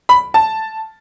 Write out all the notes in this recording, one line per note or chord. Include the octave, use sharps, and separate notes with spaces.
B5
A5